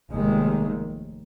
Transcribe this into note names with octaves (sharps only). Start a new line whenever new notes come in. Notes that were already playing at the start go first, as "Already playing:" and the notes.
F1 D#2 D#3 G#3